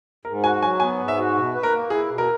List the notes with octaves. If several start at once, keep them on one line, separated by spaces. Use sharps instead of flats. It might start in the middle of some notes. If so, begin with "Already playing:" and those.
G#2 A#4
F#4 G#5
F#3 G#5
B3 G#5
G#2
E5
F#4
B2
B4
A#4
A#3
E4 G#4
B2
A#4